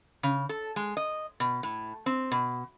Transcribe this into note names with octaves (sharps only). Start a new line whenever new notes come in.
C#3
A4
G#3
D#5
B2
A2
C4
B2